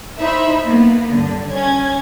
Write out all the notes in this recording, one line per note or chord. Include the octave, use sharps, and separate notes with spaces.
D#4 E4 C5 E5 B5
A#3 B3
G2 D3
C#4 G#6